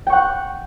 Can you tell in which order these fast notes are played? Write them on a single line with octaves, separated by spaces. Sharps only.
G5 C#6 F#5